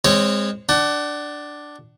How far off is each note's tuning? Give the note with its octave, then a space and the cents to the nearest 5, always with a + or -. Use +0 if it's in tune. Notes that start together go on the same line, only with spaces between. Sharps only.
G#3 -25 C4 +0 C#5 +0
D4 +0 F#5 +30